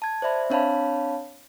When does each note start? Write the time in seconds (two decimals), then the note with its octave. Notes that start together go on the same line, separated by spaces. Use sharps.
0.02 A5 G#6
0.22 C5 D5 E5 B5
0.50 C4 D4 C#5 F5 A5 B5